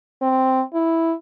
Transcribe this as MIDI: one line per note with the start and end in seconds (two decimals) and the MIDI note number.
0.22 0.62 60
0.74 1.13 64